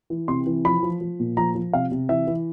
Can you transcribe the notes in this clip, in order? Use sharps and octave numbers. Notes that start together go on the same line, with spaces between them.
E3
C3 C6
E3
F3 B5
F3
F3
A#2
F3 A#5
F3
C3 F5
C3
E3 E5
E3